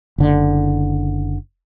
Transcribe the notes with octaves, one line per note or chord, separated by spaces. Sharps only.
F#1 D3